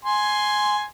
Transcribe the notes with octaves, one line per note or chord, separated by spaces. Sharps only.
G#5 C6